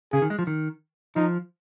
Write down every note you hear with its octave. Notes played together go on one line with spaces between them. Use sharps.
C#3 G#4
D#3
G#3
F3
D#3
F3 D#4